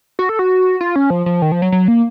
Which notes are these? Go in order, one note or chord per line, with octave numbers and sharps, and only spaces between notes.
F#4
A4
F#4
F4
C#4
F3
F3
D#3
F3
F#3
F#3
A#3